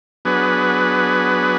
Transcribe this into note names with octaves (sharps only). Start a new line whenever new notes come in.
F#3 B3 D4 G#4 B4